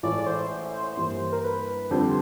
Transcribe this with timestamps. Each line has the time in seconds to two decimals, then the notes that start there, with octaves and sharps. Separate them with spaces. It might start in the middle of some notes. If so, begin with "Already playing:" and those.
0.03 A1 A2 E3 G#3 D5
0.27 C5
0.97 G2 E3 G3 A#3
1.33 A#4
1.44 B4
1.91 F2 D3 G3 C4 C5